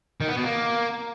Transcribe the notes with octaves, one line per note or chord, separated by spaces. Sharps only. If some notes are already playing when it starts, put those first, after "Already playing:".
D#3
B3
B2
A#3